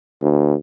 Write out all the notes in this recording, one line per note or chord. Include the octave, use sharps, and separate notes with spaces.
D2